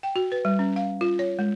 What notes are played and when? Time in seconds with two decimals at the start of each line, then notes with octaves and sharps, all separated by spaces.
0.03 G5
0.16 F#4
0.32 B4
0.45 G3
0.59 C#4
0.76 F5
1.01 F4
1.19 C#5
1.39 G#3